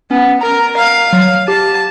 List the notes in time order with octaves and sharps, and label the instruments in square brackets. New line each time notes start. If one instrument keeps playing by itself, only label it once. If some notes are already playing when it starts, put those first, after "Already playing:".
[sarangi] B3 [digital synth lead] C#4
[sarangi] A#4 [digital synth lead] A#5
[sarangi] F5
[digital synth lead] F#3
[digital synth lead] G4 [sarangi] A5